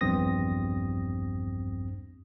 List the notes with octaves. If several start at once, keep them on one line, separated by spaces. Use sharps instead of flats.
A#1 E2 G2 C4 D#6 A#6